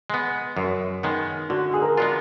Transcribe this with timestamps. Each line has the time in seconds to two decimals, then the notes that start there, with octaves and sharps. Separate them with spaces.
0.10 G#3 B3
0.57 F#2
1.03 D#3 G#3 B3
1.50 D3 F#4
1.74 G#4
1.82 A#4
1.97 G#3 B3 D4 F4